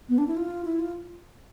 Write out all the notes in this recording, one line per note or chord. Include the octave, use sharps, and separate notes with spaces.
B3
D4
E4
F4
E4
F4